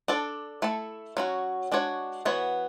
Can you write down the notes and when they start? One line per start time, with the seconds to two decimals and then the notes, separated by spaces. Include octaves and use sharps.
0.08 D4 A4 D5
0.62 A3 E4 A4
1.17 F#3 C#4 F#4
1.72 G#3 D4 F#4 C#5
2.25 E3 B3 F#4 C#5